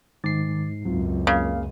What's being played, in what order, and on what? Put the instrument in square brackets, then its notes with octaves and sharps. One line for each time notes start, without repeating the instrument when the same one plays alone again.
[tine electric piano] G#2 C7 [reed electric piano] D#3 D6 A6
[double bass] C#2 F#2 [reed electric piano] F#3 C4 F4
[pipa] C#3 [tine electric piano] A#3 F5